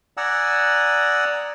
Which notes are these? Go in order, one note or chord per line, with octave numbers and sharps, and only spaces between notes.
D5 F#5 G#5 A#5 D#6 E6